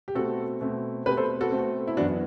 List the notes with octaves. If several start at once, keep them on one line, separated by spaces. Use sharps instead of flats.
G4
B2 A3 C4 F#4 A4
B2 A3 C4
B2 A3 C4 G4 B4
A4 C5
F#4 A4
B2 A3 C4
E4
F#2 E3 B3 D4 F#4